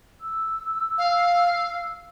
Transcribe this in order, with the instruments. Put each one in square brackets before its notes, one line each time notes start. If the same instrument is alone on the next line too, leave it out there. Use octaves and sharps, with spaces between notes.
[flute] E6
[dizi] F5